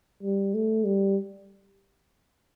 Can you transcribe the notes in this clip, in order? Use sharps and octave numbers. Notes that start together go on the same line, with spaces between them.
G3
A3
G3